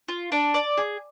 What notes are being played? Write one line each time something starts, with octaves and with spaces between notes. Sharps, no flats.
F4
D4
D5
G#4